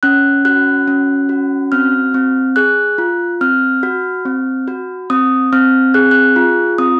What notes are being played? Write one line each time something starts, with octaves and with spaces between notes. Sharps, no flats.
C#4 F#6
F#4 F#6
C#4
F#4
C4 F6
C4
G#4 F#6
F4
C4 F6
F#4
C4
F#4
C4 D#6
C4 F6
G#4 F#6
F#6
F4
C4 D#6